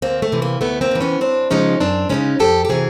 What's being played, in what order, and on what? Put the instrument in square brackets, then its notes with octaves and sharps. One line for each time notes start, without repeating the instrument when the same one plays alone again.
[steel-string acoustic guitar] D2 A#3 C4
A3
C3 E3
A#3
D2 A3 B3
A#3 C4
C3 E3
B3 C#4
F#2 C4 D4
C#3 F3 G#3 C#4 D#4
F#2 C4 D4
C#3 F3 G#3 C#4 D#4
F2 G4 A4
G4
C3 E3 F#4 G#4